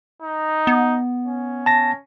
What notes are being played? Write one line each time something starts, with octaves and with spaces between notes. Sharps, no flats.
D#4
B3
C#4
A5 A#6